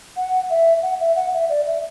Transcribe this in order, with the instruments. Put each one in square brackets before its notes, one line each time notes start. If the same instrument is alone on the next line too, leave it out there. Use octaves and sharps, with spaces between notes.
[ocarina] F#5
E5
F#5
E5
F#5
E5
D5
E5